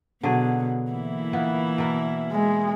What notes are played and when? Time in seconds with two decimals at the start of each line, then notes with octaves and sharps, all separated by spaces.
0.23 B2 D3 F#3 G#4
0.91 E3 A#3 E4
1.33 A#2 B3
1.78 B2 A#4 D5
2.32 G#3